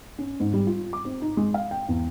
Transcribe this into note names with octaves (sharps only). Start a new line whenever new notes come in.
C#4
G#2
G3
F4
D6
C4
D#4
G#3
F5
G5
E2